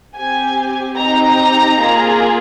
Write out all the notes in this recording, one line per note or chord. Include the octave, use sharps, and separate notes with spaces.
C4 G4 G#5
C4 D#4 G4 A#5
A#3 F4 G#4